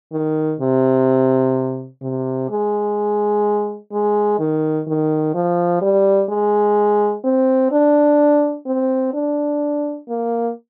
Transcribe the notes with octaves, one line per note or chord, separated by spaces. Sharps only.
D#3
C3
C3
G#3
G#3
D#3
D#3
F3
G3
G#3
C4
D4
C4
D4
A#3